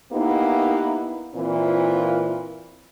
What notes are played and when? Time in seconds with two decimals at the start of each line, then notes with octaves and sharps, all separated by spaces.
0.12 A#3 B3 D#4 E4 G4
1.35 A#2 E3 C4 F4 A#4